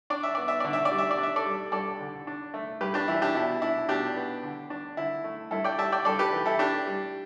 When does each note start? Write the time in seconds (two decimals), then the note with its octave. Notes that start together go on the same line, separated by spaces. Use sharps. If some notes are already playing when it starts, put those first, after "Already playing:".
0.10 D4 D5
0.23 E5
0.35 B3 D5
0.48 E5
0.60 D3 D5
0.73 E5
0.85 D5
0.91 G3
0.98 E5
1.11 D5
1.18 D4
1.23 E5
1.36 A4 D5
1.46 G3
1.72 G2 A4 D5
1.99 D3
2.27 D4
2.54 A3
2.81 G2 G4 B4
2.94 D4 G4
3.08 E3 E4
3.22 D4 G4
3.35 B2 E4
3.62 D4 E4
3.88 B2 D4 G4
4.16 B3
4.43 D3
4.70 D4
4.97 D3 E4
5.24 A3
5.51 G2 E4 A4
5.64 D5 G5
5.78 G3 E5 A5
5.92 D5 G5
6.05 G2 A4 D5
6.19 G4 B4
6.33 E3
6.46 E4 A4
6.59 D4 G4
6.87 G3